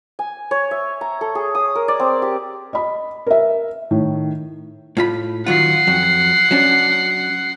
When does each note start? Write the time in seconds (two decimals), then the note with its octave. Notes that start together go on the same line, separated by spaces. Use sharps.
0.19 G#5
0.51 C#5
0.71 E5
1.01 A#5
1.21 A4
1.35 G#4
1.55 D#6
1.75 A#4
1.88 D5
2.00 C4
2.22 G4
2.73 D#5 B5
3.27 A#4 E5
3.91 A2 D#3
4.97 A2 F4 B5
5.46 D#3 F#3 F4 F#5 C7
5.87 F2 F#3
6.51 F#3 C#4 D4